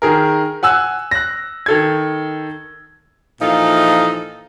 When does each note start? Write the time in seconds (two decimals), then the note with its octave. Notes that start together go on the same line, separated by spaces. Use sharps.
0.02 D#3 G#4 A#4
0.63 F#5 G#5 E6 F#6
1.11 F#6 A#6
1.66 D#3 A4 G#6
3.41 A#2 E3 F3 D#4 F4 A4